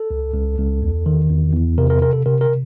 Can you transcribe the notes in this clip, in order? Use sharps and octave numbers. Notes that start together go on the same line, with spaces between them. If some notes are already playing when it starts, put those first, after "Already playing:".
Already playing: A4
C#2
C#2
C#2
E2
D#3
E2
E2
C3 A#4
A#4
C3 A#4
A4
C3 A#4
A#4
C3